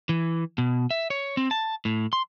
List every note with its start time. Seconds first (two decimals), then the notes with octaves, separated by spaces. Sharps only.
0.09 E3
0.58 B2
0.91 E5
1.10 C#5
1.37 C4
1.51 A5
1.85 A2
2.13 C6